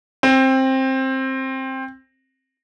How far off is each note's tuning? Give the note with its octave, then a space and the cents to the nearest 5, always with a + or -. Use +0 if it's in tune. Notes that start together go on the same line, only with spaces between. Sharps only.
C4 +15